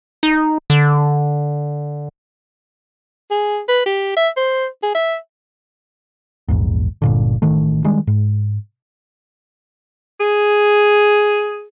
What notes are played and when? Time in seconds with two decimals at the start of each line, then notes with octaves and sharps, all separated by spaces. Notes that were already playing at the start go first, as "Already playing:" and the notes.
0.23 D#4
0.70 D3
3.31 G#4
3.68 B4
3.86 G4
4.17 E5
4.37 C5
4.83 G#4
4.95 E5
6.48 A#1 E2 G#2
7.02 G1 A#2 D3
7.42 A1 D#3 A3
7.84 D#3 G3 G#3 D4
8.07 G#2
10.20 G#4